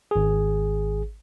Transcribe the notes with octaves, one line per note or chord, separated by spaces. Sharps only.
G#1 G#4